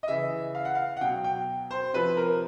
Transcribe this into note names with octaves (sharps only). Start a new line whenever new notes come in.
D#5
C#3 E3 E5
F5
F#5
F5
F#5
B2 F#3 G5
G5
C5
C3 F3 B4
A#4